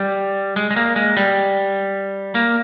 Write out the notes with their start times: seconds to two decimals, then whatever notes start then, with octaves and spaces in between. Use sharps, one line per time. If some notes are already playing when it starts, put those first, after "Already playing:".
Already playing: G3
0.56 G#3
0.71 G#3
0.76 A#3
0.96 G#3
1.17 G3
2.35 A#3